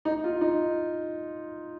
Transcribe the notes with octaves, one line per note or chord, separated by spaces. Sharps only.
D#4
F4
D#4